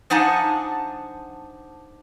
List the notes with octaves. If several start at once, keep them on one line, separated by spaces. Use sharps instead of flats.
F3 D4 D#4 F#5 G#5 A5